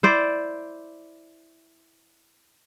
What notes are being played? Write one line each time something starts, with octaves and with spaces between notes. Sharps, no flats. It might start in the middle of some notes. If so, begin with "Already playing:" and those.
E4 C5 D5